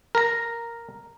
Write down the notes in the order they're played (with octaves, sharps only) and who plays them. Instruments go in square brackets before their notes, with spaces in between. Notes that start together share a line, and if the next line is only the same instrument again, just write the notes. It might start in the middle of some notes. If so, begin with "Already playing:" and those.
[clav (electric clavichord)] A#4 A#5